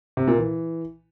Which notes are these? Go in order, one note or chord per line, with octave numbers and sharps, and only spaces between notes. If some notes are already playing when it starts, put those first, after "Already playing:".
C3
A#2
E3